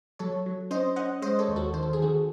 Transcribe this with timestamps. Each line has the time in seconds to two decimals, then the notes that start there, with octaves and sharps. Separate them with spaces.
0.19 F#3 A4 C#5
0.46 F#3
0.71 C#4 C5 D#5
0.96 C#4 D#5 F#5
1.22 G#3 C5 D#5
1.39 A4 C#5
1.48 D#2
1.56 F#4 A4
1.73 D#3 C5
1.83 A4
1.93 G#4
1.99 D#3 F#4 A4